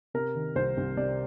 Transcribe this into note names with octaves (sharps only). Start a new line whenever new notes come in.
C3 A#4
D#3
C2 C5
C2
C3 D5